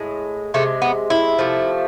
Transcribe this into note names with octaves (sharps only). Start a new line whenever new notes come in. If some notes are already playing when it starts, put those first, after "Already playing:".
Already playing: A2 G#3
C3 G#3 A3
B3
E4
C3 F3 A3